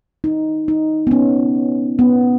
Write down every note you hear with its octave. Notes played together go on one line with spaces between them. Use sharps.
D#4
D#4
B3
C#4
B3